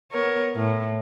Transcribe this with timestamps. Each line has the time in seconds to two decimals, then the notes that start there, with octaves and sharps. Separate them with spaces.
0.12 B3 A#4 C#5
0.56 A2